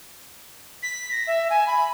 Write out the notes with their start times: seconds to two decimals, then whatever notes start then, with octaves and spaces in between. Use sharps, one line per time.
0.83 B6
1.12 A#6
1.27 E5
1.50 G#5
1.67 B5